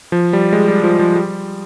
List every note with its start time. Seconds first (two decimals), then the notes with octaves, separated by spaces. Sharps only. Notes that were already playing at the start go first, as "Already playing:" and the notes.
0.12 F3
0.33 G3
0.53 G#3
0.68 G3
0.84 F3
0.99 F3
1.15 G3